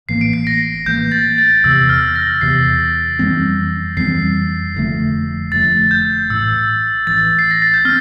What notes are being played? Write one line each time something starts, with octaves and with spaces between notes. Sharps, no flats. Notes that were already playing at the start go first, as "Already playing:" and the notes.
A1 A2 E3 A#3 C7
D7
C7
A#6
A1 A2 E3 A#3 G6
A6
A6
E2 C3 E3 E6
F6
A#6
E2 C3 E3 C7
F2 E3 G3 C4
F2 E3 G3 C4 C7
F1 F2 D3 A3
F1 F2 D3 A3 A6
G6
A1 A2 E3 E6
A1 A2 E3 A6
C7
A#6
A6
G6
C4 F6